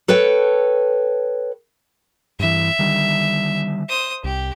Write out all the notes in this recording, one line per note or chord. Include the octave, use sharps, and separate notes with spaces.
A4 B4 C#5 G5
G2 E3 E5
D3 D#3 G3
C5 D#6
C2 G4